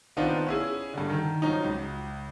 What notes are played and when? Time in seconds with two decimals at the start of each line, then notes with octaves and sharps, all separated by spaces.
0.17 D#3 B3 C4 D4 D#4 F4
0.47 C#4 E4 G#4
0.94 G2 D3
1.10 D#3
1.42 F3 F#3 C#4 D#4
1.64 C#2